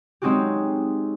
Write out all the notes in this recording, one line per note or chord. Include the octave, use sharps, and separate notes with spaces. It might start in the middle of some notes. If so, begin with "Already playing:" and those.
G#3 C4 C#4 D#4 F#4 G4